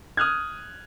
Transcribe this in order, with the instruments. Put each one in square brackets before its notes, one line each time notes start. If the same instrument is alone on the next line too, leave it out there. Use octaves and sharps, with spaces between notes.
[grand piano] D#6 F6 F#6 G#6